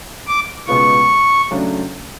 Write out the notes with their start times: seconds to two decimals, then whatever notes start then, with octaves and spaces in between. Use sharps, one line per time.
0.27 D6
0.67 C#2 B2 G#3 B3 F4 C#6
1.51 C#2 C#3 F#3 A3 D4